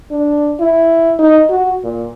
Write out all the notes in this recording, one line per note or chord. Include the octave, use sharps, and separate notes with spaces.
D4
E4
D#4
F#4
A#2